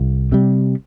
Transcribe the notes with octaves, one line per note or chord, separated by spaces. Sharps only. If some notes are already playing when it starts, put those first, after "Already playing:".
Already playing: C2
C3 G3